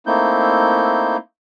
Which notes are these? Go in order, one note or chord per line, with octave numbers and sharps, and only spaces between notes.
A3 A#3 C4 D#4 E4 G6